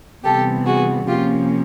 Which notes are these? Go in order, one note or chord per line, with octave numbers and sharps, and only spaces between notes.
C3 E3 G3 B3 G4 A4
F#4 G#4
C3 F3 A#3 C#4 F4 G4